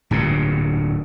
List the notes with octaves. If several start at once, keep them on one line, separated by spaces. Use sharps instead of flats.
D1 G2 A#2